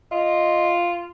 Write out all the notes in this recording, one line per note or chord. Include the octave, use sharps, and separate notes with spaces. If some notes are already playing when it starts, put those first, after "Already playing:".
F4 D#5